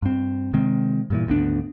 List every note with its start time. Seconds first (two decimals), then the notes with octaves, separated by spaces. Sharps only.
0.02 G2 C4
0.53 C3 D#3 G#3 C4
1.10 G2 A#2 E3
1.27 G#1 D2 B3 D4